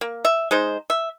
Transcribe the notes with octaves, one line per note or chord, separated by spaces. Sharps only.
A#3
E5
G#3 D#4 C5
E5